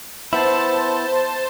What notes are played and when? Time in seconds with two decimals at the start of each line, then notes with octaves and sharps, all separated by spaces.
0.33 B3 E4 C5 A5